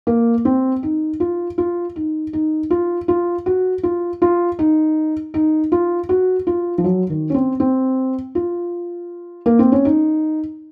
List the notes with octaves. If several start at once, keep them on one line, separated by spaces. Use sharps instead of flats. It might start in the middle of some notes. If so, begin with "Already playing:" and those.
A#3
C4
D#4
F4
F4
D#4
D#4
F4
F4
F#4
F4
F4
D#4
D#4
F4
F#4
F4
F3
F#3
D#3
C#4
C4
C4
F4
A#3
C4
C#4
D#4